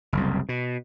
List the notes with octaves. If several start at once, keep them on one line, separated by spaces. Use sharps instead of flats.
F#1 C2
B2